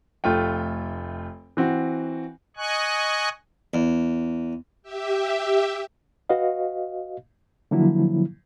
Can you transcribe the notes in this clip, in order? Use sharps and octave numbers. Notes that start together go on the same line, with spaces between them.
F1 A3 F4 G5
E3 C4 F#4
D#5 G#5 C#6 F#6
E2
G4 E5
F#4 B4 D#5 F5
D3 F3 F#3 A#3 E4